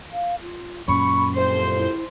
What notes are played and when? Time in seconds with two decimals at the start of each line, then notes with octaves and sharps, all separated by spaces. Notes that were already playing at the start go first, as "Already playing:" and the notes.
0.12 F5
0.41 F4
0.88 F#2 A#2 C#4 B5 C#6
1.37 C2 F2 C5
1.74 E4